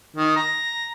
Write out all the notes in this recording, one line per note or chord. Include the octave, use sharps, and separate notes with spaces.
D#3
A#5